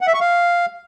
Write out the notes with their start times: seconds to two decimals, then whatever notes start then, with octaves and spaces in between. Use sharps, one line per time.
0.01 F#5
0.07 E5
0.14 C#6
0.21 F5